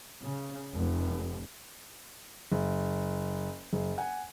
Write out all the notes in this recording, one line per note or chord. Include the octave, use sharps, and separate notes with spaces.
C#3
F1
F#1
F#1
F#5 G#5